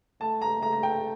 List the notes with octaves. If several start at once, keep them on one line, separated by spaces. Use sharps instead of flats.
A3 A5
A#5
A3 A#5
A#5
G5